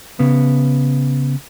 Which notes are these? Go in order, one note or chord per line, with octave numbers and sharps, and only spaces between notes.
C#3 B3